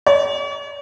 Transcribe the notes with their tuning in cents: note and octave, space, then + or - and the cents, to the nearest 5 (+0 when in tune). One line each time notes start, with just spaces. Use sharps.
C#5 +40